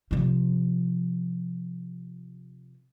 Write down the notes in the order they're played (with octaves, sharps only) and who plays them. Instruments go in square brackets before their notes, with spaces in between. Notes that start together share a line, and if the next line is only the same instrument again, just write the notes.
[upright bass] C3 F3